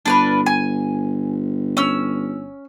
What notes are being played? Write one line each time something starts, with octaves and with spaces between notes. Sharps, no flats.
G1 D4 B4 F6
G#5
C#4 E6